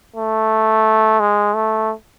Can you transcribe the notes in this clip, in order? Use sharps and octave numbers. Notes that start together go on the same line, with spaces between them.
A3
G#3
A3